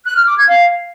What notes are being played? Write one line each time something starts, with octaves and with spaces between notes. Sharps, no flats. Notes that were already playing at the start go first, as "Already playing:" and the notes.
F#6
F6
D6
G#6
F5